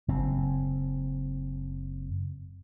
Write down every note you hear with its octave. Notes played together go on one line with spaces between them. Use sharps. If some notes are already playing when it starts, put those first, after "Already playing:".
F#1 C4